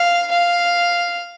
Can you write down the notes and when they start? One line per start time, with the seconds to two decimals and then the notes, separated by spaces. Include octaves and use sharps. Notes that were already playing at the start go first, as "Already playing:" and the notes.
Already playing: F5
0.31 F5